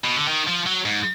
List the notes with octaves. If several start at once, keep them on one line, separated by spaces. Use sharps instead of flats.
B2
D3
D#3
F3
F#3
G#2